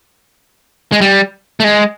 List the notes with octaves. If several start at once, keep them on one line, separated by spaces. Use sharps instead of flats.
G#3
G3
A3
G#3